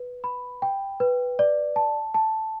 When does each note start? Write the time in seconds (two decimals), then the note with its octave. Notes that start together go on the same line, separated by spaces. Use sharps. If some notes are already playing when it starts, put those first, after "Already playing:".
Already playing: B4
0.24 B5
0.62 G5
1.00 B4
1.39 D5
1.76 A5
2.14 A5